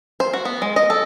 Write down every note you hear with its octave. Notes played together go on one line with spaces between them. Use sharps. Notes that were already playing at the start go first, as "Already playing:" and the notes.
C5
F#4
B3
G#3
D#5
A4